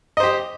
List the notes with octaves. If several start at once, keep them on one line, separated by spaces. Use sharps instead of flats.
G4 C5 D#5